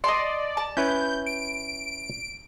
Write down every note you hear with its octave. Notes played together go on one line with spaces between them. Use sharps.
D5 D#5 A5 C6
A5
C#4 E4 B4 G6
D7